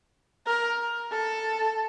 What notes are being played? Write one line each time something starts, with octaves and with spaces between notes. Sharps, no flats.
A#4
A4